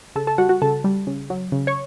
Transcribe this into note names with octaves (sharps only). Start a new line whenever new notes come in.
C#3 A4 A5
A4 A5
G3 F#4 F#5
F#4 F#5
C#3 A4 A5
G3
C#3
F#3
C#3
C#5 C#6